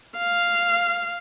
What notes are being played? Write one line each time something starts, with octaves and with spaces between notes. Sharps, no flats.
F5